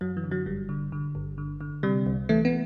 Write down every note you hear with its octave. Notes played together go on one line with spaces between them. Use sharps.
F#2 F#3
E3
D3
F#3
G1 G3
D3
D3
G1
D3
D3
C3 G3
C2
E3 A3
B3